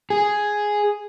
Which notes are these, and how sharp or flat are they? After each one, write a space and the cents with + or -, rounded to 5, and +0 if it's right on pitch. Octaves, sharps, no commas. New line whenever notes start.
G#4 +0